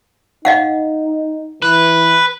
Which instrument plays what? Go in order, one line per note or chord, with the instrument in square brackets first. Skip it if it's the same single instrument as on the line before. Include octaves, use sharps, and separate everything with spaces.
[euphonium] D#4 [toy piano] D#5 F5 F#5
[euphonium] E3 [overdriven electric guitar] B4